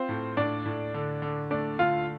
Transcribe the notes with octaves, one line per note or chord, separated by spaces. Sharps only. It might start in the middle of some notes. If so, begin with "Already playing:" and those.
Already playing: C4 F4 C5
A2
A2 D4 D5
A2
D3
D3
A3 D4 D5
D3 F4 F5